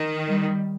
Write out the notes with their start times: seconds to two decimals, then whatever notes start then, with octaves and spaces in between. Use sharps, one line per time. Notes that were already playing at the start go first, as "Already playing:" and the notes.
Already playing: D#3
0.27 G3